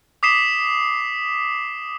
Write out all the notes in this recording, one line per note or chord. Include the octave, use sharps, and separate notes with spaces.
D6 D#6 B6 C7 E7 G7